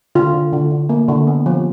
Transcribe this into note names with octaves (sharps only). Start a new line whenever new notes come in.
D3 F4
D3
D3
D3
A#3
D3
B3
F3